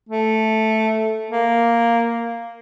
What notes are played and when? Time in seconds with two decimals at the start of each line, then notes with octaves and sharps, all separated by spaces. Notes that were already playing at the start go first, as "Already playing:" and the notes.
0.09 A3
1.30 A#3